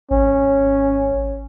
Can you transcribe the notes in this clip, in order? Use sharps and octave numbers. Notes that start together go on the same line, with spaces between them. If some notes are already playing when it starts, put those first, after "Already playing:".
G#1 C#4